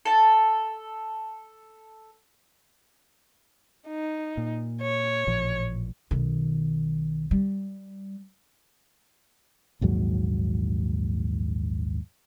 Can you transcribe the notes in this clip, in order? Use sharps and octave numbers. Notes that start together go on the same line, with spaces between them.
A4 A5
D#4
A#2
C#5
A1 A#2 F3
B1 D#3
G3
A#1 D#2 G#2 F#3